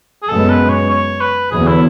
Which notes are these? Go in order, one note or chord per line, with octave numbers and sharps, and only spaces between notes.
G#4
F#2 C#3 G#3 B3 A4
B4
C#5
C#5
B4
E2 D3 F#3 B3 G#4
E4